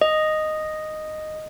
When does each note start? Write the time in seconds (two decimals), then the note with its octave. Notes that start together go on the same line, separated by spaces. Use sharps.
0.01 D#5